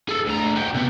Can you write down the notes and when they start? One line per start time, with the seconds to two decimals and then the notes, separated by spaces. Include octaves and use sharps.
0.09 G#4 A4
0.26 D2 A#5
0.56 F#4 G4
0.74 C3 B3